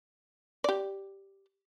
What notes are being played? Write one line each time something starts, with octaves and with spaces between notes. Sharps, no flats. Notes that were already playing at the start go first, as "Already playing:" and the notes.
G4 D5